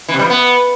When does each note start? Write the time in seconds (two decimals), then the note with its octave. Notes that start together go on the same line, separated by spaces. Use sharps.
0.08 E3
0.14 C3
0.19 G3
0.24 F3
0.30 B3